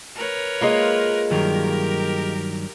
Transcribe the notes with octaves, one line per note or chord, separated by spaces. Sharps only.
A#4 B4 C#5
G#3 A#3 F4
G2 D#3 F#3 G4 A#4